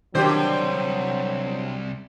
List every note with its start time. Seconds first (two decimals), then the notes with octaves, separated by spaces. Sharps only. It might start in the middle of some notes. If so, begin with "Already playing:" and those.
0.15 C2 D3 D#3 F#3 D4 G4 C5 G5